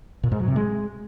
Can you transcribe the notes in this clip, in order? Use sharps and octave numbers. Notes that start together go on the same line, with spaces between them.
A#2
G#2
F#3
C3
G#3